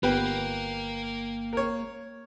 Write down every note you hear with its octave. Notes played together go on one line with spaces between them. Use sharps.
G1 A#3 B3 G4 B4 G5
A#4 C#5